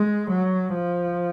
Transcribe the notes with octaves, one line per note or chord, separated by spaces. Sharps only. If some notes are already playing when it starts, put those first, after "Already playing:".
Already playing: G#3
F#3
F3